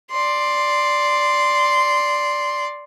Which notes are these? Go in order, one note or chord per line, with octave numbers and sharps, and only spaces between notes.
D5 C6